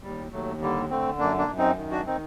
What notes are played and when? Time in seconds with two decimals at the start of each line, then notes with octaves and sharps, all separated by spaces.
0.03 D#2 G3
0.32 D#2 F#3 A3
0.61 D3 G3 A#3
0.90 D3 A3 C4
1.19 F#2 A#3 D4
1.38 A#3 D4
1.48 F#2
1.58 C4 D#4
1.77 D#3
1.91 D4 F#4
2.06 D#3 C4 D#4